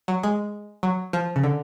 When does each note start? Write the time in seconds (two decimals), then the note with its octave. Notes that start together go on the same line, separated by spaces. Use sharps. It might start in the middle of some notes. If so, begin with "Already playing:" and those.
0.08 F#3
0.23 G#3
0.83 F#3
1.13 F3
1.36 C#3
1.43 D3